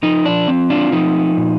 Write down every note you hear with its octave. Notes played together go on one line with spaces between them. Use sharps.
F3 D#4
D4
C4
D4 F4
F3 D#4
A#2